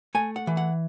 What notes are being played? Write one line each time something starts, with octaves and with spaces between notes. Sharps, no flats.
A3 G#5
F#5
E3
F#5